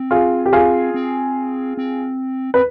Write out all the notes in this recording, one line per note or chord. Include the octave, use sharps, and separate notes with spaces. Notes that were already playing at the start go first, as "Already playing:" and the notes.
Already playing: C4
F4 G#4
G4
F4 G#4
C4
C4
C4 B4